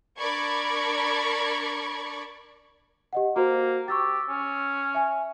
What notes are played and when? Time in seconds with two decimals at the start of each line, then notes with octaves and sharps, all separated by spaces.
0.18 D4 A#4 D5 B5 C#6 G#6
3.13 G4 D#5 F#5
3.36 A#3 F#4 C5
3.88 G4 C#6 E6 A6
4.29 C#4
4.95 E5 G#5